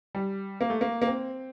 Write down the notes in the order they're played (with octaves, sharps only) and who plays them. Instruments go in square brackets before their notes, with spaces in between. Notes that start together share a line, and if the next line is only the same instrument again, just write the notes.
[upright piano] G3
A#3
A3
A#3
A#3
C4